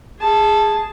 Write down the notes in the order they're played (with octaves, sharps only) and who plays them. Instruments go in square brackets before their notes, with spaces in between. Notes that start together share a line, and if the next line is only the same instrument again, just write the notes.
[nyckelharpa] G#4 A5